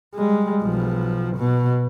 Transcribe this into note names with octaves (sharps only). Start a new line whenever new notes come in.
G3 G#3
B1 F3
B2